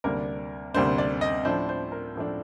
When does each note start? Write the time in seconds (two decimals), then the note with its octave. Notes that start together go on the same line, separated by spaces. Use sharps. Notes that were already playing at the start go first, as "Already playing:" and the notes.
0.04 D2 C3 G3 A#3 D4 A#4
0.74 D2 C3 G3 A#3 D4 C5
0.98 D5
1.21 D#5
1.45 A2 F3 A3 D4 C5
1.69 C5
1.92 A#4
2.16 A2 F3 A3 D4